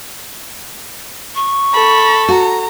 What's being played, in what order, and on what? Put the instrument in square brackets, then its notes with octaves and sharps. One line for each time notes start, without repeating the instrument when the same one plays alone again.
[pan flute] C#6
[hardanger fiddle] A4 [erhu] B5
[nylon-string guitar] F#4 [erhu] A#5